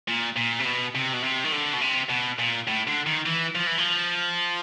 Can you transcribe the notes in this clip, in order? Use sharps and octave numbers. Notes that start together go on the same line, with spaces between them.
A#2
A#2
C3
B2
C3
B2
C3
D#3
D3
B2
C3
B2
A#2
A2
D3
D#3
E3
F3
E3
F3